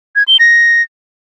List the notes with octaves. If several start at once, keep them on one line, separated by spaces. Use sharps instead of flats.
G#6
G7
A#6